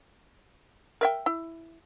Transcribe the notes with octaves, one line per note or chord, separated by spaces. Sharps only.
A#4 E5 G5
E4